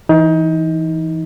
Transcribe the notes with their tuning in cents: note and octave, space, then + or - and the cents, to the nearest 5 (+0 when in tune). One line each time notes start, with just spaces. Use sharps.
E3 +0 D#4 +25